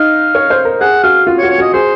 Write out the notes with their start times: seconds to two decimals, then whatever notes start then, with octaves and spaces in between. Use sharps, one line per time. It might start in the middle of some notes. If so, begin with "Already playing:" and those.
Already playing: D#4 F5
0.35 C#5
0.50 C5
0.65 A#4
0.81 G#4 F#5
1.03 F#4 F5
1.27 F4
1.39 C#5
1.43 F#4
1.50 C#5
1.58 F#4 D#5
1.73 G#4 C5